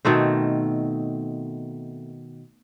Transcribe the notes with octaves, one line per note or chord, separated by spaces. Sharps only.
B2 D#3 A3 C4